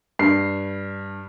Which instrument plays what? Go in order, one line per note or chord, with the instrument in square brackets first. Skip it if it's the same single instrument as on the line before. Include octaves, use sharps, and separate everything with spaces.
[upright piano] G2 C7